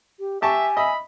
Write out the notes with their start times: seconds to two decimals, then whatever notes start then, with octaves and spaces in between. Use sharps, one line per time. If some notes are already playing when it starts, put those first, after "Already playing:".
0.20 G4
0.42 G4 E5 G#5 A5 C#6
0.77 D#5 E5 B5